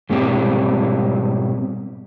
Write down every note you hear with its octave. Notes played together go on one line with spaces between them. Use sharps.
G#2 B2 G3 C4